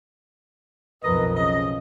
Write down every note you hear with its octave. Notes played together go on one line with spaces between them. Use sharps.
B1 F2 A#4 B4 D#5
C#3 D#5